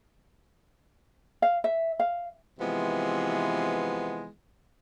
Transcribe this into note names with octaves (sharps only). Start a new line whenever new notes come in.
F5
E5
F5
C3 E3 F3 G#3 B3